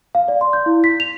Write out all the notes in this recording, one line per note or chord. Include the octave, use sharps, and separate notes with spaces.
F5
D5
C6
G6
E4
B6
F7